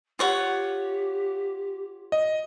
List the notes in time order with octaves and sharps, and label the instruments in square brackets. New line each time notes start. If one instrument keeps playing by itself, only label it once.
[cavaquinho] F4 C#5 F#5 [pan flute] G4
[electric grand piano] D#5